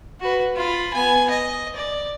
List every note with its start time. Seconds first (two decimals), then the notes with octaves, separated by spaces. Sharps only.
0.21 F#4 B4
0.55 F4 B5
0.94 B3 G#5
1.30 D#5
1.76 D5